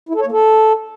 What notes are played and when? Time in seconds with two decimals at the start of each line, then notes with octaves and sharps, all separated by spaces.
0.09 E4
0.15 A4
0.20 C#5
0.26 A#3
0.32 A4